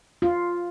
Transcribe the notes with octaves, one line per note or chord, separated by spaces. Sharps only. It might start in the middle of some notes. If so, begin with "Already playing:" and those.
F4